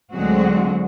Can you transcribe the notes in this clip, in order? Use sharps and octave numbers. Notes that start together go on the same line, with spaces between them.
D2 D3 F#3 G#3 C4 F#4